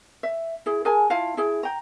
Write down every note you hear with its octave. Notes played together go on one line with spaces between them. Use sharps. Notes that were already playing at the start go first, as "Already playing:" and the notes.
E5
E4 G#4
G#4 A#4 G#5 A5
E4 F4 F5 A5
E4 G#4
G5 A#5